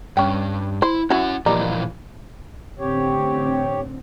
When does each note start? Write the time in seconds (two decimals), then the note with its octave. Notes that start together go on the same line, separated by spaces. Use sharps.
0.17 G2 C#4 G5
0.82 E4 C5
1.10 C#4 E4 F#4 F#5
1.46 A#2 E3 F3 G3 A#3 D#4
2.79 A1 D3 C4 G4 C#5